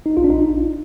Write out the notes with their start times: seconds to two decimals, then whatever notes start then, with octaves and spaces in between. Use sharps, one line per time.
0.06 D#4
0.17 A#1 F4
0.24 D4
0.30 D#4